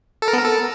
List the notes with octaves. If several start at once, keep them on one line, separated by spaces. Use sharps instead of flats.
A4
A#4
B3
A#4
A4